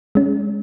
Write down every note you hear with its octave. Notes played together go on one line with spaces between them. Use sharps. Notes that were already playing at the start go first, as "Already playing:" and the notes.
G#3 C#4